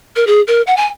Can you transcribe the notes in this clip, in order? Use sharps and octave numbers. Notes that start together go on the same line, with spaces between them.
A#4
G#4
A#4
F#5
G#5